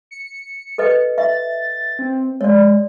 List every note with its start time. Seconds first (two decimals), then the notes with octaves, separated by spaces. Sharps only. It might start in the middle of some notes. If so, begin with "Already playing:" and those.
0.11 C#7
0.78 A4 B4 D#5
1.18 E5 A6
1.99 C4
2.41 G#3 C#5 D5